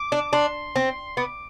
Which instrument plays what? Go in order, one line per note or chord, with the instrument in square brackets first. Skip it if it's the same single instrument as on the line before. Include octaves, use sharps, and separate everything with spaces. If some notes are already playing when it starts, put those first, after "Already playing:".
Already playing: [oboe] D6
[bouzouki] D4
[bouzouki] D4 [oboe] C6
[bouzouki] C4
[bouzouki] B3 [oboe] D6